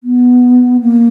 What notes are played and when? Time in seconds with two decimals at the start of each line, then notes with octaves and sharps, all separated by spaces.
0.04 B3
0.81 A#3